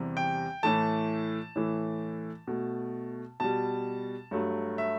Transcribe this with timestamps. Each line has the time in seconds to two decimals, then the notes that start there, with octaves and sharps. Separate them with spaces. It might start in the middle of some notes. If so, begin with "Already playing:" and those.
Already playing: E2 C3 G3
0.17 G5
0.63 A2 E3 A3 A5
1.56 A2 E3 A3
2.47 B2 A3
3.40 B2 G3 A5
4.31 G2 F#3 A3
4.78 E5